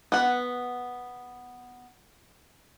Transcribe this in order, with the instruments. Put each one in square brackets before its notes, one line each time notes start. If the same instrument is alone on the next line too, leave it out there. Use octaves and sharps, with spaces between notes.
[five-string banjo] B3 F#5